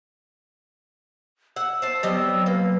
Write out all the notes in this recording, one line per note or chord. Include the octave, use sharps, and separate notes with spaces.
F#5 E6
C5 A5
F#3 G3 B3 C4 D#5
A#3 B4